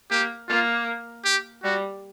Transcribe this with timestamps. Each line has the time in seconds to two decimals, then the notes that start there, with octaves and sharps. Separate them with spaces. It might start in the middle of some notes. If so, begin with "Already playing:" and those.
0.11 A#3 G4
0.49 A#3 F4
1.25 G4
1.64 G3 F#4